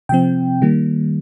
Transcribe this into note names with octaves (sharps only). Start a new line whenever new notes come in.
C3 F3 C4 G5
D#3 G3 A#3